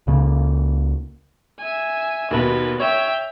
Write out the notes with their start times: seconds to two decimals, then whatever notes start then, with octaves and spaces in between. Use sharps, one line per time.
0.07 C#2 C#3 A#3
1.59 E5 G#5
2.31 D#2 B2 B4
2.80 C#5 E5 G5